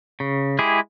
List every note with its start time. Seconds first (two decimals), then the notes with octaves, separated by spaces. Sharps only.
0.20 C#3
0.59 G#3 E4 G4 G#4